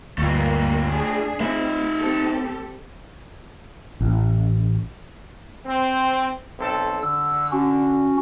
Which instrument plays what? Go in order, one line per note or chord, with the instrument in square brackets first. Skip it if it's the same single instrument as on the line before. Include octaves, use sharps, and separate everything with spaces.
[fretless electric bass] D2 [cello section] G2 A#3 [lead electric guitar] A3 F4
[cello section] D4 G#4
[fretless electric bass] A3 [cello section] C4 [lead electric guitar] D#4 E5
[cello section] C4 G4 A4
[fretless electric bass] A1
[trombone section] C4
B1 C4 A4
[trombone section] D3 [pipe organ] E6
[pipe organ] C#4 F#4